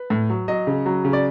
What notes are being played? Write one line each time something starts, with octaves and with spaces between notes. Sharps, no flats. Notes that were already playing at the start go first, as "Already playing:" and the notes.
Already playing: B4
A2
F#3
F#3 D#5
C#3
F#3
C#3
D5